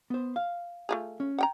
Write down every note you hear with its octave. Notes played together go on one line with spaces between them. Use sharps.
B3 C5
F5
A3 F4 G#4
C#4
F#5 G5 A#5